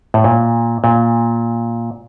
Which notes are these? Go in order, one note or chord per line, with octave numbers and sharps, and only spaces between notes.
A2
A#2
A#2